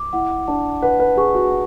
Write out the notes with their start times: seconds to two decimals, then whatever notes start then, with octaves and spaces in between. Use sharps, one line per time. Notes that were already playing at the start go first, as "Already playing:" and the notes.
Already playing: D6
0.13 E4 F#5
0.48 D4 A5
0.82 B4 F#5
1.00 B4
1.17 G#4 C#6
1.35 F#4